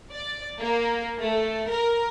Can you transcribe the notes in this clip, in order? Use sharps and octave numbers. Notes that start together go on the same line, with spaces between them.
D5
A#3
A3
A#4